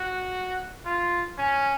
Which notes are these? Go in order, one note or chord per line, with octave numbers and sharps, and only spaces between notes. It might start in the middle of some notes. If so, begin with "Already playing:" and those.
Already playing: F#4
F4
C#4